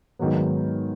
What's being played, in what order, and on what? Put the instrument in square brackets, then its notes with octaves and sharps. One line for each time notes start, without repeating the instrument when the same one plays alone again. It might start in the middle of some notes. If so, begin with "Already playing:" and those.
[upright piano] G#2 D#3 F#3 B3